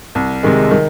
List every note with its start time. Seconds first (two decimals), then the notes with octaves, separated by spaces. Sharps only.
0.15 C2
0.43 C3 D#3 G#3
0.71 D#3